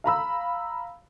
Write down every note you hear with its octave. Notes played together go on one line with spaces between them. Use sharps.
F5 A#5 B5 E6